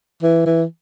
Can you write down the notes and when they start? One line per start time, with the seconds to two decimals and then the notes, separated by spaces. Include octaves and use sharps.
0.22 E3
0.46 E3